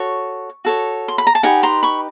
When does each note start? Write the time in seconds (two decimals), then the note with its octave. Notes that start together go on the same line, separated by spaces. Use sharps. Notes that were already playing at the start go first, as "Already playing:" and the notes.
Already playing: F#4 A4 C#5 C#6
0.65 F#4 A4 C#5
1.08 C6
1.18 B5
1.27 A#5
1.35 A5
1.43 D#4 G4 B4 F#5 G#5
1.63 A#5 C6
1.83 B5 C#6